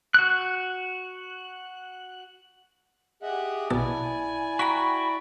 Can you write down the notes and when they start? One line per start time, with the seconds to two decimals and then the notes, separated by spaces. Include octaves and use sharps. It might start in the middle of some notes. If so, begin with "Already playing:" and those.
0.14 F#4 F#6
3.23 G4 G#4 D#5 E5 F#5
3.70 A#1 B2 E4 D5 G#5 A5
4.59 F#4 G5 A#5 B5 B6